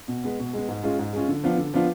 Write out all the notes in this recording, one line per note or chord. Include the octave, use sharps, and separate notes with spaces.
B2
G#3 B3
B2
G#3 B3
G#2
G#3 C#4 F4
G#2
G#3 C#4 F4
D3
F3 B3 D4 F4
D3
F3 B3 D4 F4